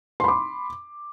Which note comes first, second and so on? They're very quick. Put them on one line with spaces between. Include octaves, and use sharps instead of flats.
C6 B5 D6